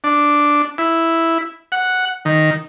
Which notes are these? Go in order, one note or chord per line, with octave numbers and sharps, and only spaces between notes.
D4
E4
F#5
D#3